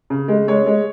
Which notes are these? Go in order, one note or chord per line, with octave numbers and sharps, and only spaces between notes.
C#3
G#3
G#3 C#5
G#3